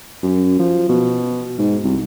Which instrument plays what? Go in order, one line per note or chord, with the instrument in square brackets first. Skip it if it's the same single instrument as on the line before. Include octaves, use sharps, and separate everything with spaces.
[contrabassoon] F#2
F3
B2
G#2
C2